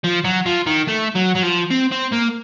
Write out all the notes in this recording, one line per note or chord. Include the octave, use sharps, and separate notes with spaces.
F3
F#3
F3
D#3
A3
F#3
F#3
F3
C4
C4
A#3